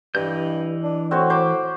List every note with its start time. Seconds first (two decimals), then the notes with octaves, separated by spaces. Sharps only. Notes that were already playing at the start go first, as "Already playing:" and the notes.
0.15 G2 E3 D#5 G6
0.83 D4
1.11 A2 C4 F#4 C#5
1.30 C5 B5 D6